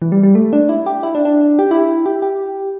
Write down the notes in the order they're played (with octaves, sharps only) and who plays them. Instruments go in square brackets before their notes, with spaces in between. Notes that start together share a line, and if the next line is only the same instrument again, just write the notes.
[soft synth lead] E3
G3
G3
A3
D4
E4
G4
E4
D4
D4
G4
E4
G4
G4